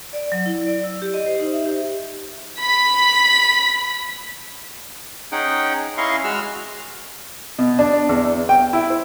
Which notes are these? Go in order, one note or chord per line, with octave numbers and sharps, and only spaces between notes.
D5
F#3
E4
D5
E6
G4
D#5
C5
D#4
E5
G4
B5 B6
C#4 D#4 G#4 F#5 G5
C#4 E4 D#5 F5 C6 C#6
G#3 F#4 E6 F6
B2
D4
E2
G5
E4
C5